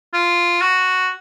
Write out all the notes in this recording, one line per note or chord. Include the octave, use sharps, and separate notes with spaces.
F4
F#4